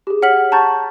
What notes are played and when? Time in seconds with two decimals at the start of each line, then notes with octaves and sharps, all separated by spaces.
0.07 G4 G#4
0.22 C#5 F#5 F6 B6 F#7
0.52 A5 A#5 C#6 G6 A6